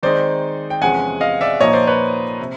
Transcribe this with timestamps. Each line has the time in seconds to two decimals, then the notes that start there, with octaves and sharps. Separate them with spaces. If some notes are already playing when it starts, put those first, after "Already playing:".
0.03 D#3 G#3 C4 D#4 C5 D5
0.70 G5
0.81 E2 C3 F3 G#3 C#4 F#5 G#5
1.21 D#5 F5
1.41 D5 E5
1.60 A#2 F3 A#3 D#4 C#5 D#5
1.73 C5 D5
1.87 B4 C#5
2.40 C3